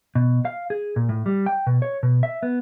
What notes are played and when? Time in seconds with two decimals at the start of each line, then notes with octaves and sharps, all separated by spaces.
0.15 B2
0.45 F5
0.70 G#4
0.96 A#2
1.09 A2
1.26 G3
1.46 G5
1.67 B2
1.82 C#5
2.03 B2
2.23 E5
2.43 B3